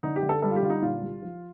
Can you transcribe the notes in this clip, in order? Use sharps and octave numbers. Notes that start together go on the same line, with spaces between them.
D3 D#4
G4
D3
A4
G3 A4
F4
G4
D3 F4
D#4
A#2 F4
C2
F3